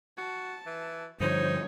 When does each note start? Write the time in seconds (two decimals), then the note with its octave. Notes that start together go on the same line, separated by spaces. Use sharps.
0.17 F#4 A5
0.66 E3
1.20 G2 D3 F3 D#4 C5 C#5